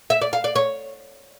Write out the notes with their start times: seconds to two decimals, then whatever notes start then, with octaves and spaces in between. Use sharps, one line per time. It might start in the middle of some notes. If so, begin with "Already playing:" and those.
0.10 E5
0.21 D5
0.33 F5
0.44 D5
0.56 C#5